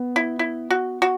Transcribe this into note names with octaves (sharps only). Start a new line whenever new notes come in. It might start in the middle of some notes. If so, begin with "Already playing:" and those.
Already playing: B3
E4
E4
F#4
F#4